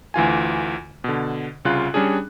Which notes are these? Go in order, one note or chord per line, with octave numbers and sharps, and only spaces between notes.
D2 E3 F4 G#5
B2 D3
C2 C#3 F4 F#6
G3 C#4 D4 G#4